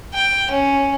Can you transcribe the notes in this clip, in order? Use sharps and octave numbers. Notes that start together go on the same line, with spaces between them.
G5
C#4